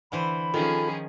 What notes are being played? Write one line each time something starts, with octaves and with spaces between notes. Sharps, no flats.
D3 E3 C5 B5
D#3 F3 C#4 F4 G#4 A4